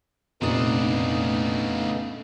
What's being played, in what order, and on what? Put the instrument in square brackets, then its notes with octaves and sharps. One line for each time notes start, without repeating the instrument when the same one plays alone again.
[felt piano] F1 [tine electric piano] A#2 D#6 [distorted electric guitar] C#3 D4 [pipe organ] A3 B3 D#4